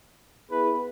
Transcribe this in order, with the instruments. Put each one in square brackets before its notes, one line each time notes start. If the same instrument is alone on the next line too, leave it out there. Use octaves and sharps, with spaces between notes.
[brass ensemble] B3 E4 G#4 B4